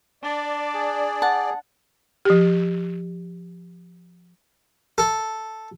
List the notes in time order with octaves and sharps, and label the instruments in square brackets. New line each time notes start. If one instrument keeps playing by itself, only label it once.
[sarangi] D4 [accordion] D5
[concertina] G#4
[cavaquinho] F#5 A5
[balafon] F3 G4
[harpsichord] A4